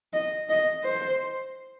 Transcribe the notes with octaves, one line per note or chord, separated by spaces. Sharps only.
D#5
D#5
C5